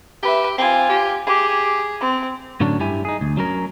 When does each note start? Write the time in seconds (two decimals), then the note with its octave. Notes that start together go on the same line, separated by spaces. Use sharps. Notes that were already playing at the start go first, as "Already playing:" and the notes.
0.23 G4 B4 E5
0.58 C4 F4 G#5
0.89 G4
1.27 G4 G#4
2.01 C4
2.60 A2 D3 F#3 C#4 D4
2.80 G2 E4 G4 E5 G#5
3.05 D#4 G#4
3.21 D2
3.37 F#3 C#4 A#4